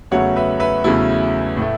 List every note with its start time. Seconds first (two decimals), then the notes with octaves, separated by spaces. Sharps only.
0.11 E2 C#3 F#3 A3 C#5 F#5
0.36 B4 E5
0.60 B4 E5
0.84 E2 C#3 F#3 A3 E4
1.57 A2 A3